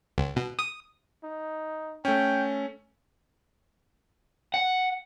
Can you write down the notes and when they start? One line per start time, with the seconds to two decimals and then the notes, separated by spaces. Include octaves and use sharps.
0.18 C#2
0.36 B2
0.59 D#6
1.24 D#4
2.05 A3 C#4 G5
4.54 F#5